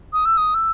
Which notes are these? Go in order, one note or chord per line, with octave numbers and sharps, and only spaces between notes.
D#6
E6
D#6
E6